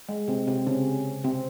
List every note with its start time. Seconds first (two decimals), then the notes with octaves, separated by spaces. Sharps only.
0.09 G#3
0.28 C3 C4
0.47 C3 C4
0.67 C#3 C#4
1.24 C3 C4